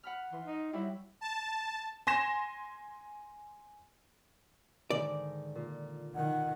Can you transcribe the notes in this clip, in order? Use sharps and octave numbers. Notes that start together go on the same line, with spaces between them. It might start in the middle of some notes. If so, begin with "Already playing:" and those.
F#5 B5 F6
E3 C6
D#4
F#3 G3 E4
A5
G#5 C6 A#6 E7
G#2 D3 D#3 D5
A#2
D#3 F#5